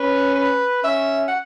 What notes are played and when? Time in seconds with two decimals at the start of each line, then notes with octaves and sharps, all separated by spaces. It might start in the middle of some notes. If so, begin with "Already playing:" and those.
Already playing: C#4 B4
0.35 B4
0.84 C#4 E5
1.28 F#5